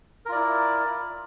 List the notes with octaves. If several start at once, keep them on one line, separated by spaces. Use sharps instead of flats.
E4 F4 A#4 D5